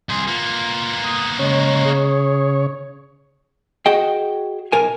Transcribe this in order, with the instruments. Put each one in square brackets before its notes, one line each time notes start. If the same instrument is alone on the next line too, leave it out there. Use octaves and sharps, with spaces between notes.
[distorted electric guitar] C2 G#4 [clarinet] C6
[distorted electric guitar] A#3 B3 [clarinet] F4
[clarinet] D#6
[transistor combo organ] C#3 C#5 [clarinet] G#3
[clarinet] G#4
[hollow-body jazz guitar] F#4 G#4 D#5 F#5 G5
B1 A#4 G#5